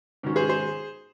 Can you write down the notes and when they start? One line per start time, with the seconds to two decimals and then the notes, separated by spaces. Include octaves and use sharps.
0.23 G#2 D#3 F#3 C#4
0.36 G#4 C5
0.49 G#4 C5